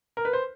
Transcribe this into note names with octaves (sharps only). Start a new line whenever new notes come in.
A#4
B4
C5